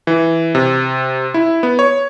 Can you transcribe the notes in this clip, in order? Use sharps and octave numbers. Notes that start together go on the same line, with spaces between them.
E3
C3
E4
B3
C#5